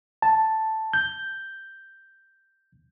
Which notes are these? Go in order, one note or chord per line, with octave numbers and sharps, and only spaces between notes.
A5
G6